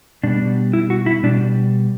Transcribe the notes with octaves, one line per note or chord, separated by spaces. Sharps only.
B2 G3 B3 D4
E4
F#4
E4
B2 G3 D4